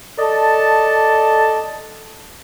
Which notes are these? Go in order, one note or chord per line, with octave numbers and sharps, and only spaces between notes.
A4 D5 D#5 A5